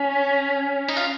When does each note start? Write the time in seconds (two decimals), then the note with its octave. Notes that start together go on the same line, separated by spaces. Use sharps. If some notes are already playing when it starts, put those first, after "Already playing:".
Already playing: C#4
0.88 D#4
0.97 F4